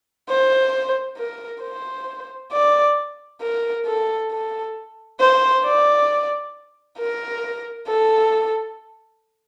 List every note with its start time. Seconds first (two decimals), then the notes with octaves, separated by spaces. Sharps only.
0.29 C5
1.18 A#4
1.62 C5
2.52 D5
3.42 A#4
3.86 A4
4.31 A4
5.20 C5
5.64 D5
6.99 A#4
7.87 A4